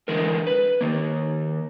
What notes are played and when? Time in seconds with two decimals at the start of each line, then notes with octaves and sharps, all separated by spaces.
0.08 D3 E3 G#3 A#4
0.47 B4
0.81 D#3 A#3